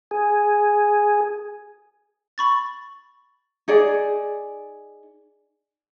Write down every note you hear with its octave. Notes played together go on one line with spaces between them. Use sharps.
G#4
B5 C#6 A6
D#4 G#4 D5